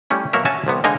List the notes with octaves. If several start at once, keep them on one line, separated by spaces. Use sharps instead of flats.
G3 A3 C#4 E4
B2 F#3 A#3 F#4 A#4 E5
C#4 F#4 E5 G#5 A5
C2 C3 B3
D3 G#3 A#3 D#4 G#5 A#5